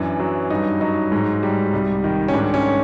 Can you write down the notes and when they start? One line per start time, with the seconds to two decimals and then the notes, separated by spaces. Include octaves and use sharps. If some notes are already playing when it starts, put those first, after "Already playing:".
Already playing: F#2 E3 D4
0.20 F#3
0.50 G2 D#4
0.81 F#3 D#4
1.12 G#2
1.43 G3
1.73 C2
2.04 D#3
2.28 C#4
2.33 G#2 D4
2.54 C#4